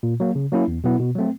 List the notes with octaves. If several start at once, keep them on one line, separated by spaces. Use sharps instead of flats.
A#2
F#3 A#3
C#3
F#3 A#3 C#4 E4
E2
B2 F#3 B3 E4
B2
F#3 A3 C4